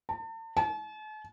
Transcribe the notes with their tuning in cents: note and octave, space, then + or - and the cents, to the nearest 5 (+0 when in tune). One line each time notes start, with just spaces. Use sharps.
A5 +40
A5 -45